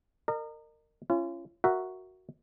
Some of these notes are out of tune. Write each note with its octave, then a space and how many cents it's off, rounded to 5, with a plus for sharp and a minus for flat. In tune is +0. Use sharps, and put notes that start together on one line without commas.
A#4 -25 D#5 -40
C#4 -10 F4 -40
F#4 +0 A#4 +0 E5 +0